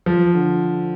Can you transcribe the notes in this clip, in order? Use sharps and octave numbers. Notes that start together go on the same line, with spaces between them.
F3
D3